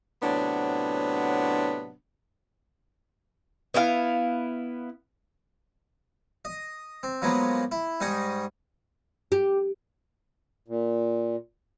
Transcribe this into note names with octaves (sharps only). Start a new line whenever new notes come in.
A2 C3 F#3 B3 D4
B3 E4 G4 F5
D#5
C4
F3 F#3 G#3 A#3 B3
E4
G#2 G3 G#4 D#5 C#6
G4
A#2